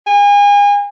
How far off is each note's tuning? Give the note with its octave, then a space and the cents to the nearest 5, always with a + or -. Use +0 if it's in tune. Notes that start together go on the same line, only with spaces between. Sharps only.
G#5 -35